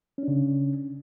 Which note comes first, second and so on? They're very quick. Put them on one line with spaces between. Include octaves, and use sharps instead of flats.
C#4 D4 C#3